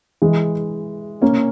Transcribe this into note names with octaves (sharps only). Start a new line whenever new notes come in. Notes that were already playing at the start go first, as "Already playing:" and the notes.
E3 G#3
A#3 C#4